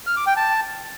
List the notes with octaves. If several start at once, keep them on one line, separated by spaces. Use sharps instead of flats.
F6
D6
G5
A5